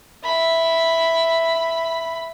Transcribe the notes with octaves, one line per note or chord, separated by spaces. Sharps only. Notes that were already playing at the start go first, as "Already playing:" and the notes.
E5 B5